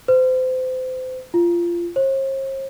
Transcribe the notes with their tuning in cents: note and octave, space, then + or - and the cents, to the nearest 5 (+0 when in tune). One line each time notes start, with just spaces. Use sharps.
C5 -30
F4 -20
C5 +45